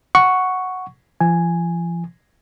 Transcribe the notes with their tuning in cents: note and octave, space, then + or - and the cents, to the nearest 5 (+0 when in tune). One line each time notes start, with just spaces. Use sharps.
F#5 +0 C#6 +0
F3 -35 G#5 +0